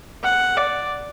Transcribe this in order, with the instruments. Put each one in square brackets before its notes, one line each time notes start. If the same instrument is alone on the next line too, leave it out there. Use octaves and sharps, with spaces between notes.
[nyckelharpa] F#5
D5